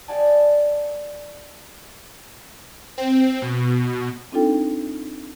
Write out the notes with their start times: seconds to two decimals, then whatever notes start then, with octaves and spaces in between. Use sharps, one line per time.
0.08 G4 D5 D#5 F#5 G#5 A5
2.98 C4
3.42 B2
4.32 C4 D4 D#4 F4 A4 G5